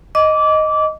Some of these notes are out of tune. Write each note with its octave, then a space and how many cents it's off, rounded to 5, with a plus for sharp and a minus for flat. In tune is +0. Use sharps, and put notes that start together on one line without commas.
D#5 +0 D6 -20